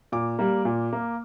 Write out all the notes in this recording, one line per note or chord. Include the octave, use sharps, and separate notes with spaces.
A#2 D6
G3 A#3
A#2
A#3